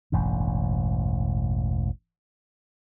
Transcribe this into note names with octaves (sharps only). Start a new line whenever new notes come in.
E1 A1 G2